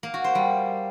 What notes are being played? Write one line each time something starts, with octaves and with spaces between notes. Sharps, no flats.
A#3
F#4
C5
G3